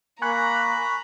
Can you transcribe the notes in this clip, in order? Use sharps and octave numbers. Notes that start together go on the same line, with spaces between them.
A#3 G#5 A#5 B5 C#6 F#6